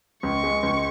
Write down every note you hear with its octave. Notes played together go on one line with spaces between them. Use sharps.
C#2 C#6
G#3
C#2